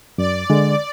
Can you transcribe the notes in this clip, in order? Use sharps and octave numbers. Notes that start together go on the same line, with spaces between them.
F#2 D5
D3 G#3